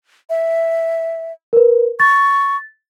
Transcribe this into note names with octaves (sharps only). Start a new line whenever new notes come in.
E5
A#4 B4
C#6 A6